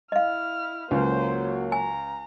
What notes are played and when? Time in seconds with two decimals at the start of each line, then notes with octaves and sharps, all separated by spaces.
0.12 E4 D#5 F5 F6
0.91 C#2 F#3 A#3 C5
1.72 G#5 A#5